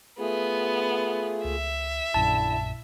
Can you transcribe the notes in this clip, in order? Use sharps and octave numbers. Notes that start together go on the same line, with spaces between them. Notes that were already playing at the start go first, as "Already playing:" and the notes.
A3 B3 F4 G#4
C#2 E5
A#1 F#2 A#2 D3 E4 A5